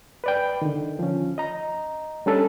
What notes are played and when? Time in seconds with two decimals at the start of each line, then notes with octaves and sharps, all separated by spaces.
0.24 B4 D5 G5
0.62 D3 D#3
0.99 F3 C#4
1.38 D#5 A#5
2.26 G3 C#4 D4 A4